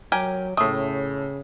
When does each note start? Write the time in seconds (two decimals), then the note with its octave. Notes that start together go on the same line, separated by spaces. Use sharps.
0.12 F#3 G4 A#4 G#5
0.57 A2 C#3 A3 D#6